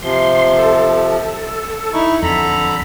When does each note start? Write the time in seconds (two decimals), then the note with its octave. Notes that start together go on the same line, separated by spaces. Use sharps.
0.03 C3 F3 C6
0.58 A4
1.94 D#4 E4 C#6
2.23 F2 D3 A4 A#5 B5